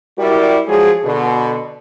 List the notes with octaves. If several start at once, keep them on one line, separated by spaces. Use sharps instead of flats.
G3 E4 F#4 G4 A#4 D5
F3 F#3 G#3 G#4
B2 D3